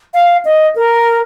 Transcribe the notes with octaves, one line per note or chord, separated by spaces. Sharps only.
F5
D#5
A#4